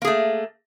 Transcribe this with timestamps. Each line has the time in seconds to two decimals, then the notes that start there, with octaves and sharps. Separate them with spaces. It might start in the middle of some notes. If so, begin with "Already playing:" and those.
0.02 A#3
0.05 G#4
0.07 A3